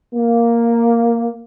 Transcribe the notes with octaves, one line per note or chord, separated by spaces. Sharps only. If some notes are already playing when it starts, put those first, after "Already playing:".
A#3